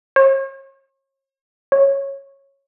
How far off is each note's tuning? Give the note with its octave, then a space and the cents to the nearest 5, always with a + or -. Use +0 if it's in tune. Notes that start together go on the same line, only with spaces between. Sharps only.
C#5 -40
C#5 -10